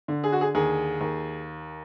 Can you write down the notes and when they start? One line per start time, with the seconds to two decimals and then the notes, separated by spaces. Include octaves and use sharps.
0.08 D3
0.24 G#4
0.32 F#4
0.41 G#4
0.55 D#2 G#4
1.01 D#2